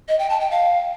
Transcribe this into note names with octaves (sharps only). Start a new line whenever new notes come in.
D#5
G5
A5
G5
F5